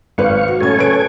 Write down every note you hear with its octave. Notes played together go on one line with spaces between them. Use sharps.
G#1 B4 F5 C#6
F#4
F#2 A2 A4 C#5 G#5 G#6
C#3 B4 D7